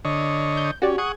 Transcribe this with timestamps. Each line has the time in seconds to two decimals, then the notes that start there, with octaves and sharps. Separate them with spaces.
0.05 D3 C#5 D#5
0.57 G6
0.82 C#4 F#4 G4 D5
0.98 G#4 F#5 C#6 D#6 G#6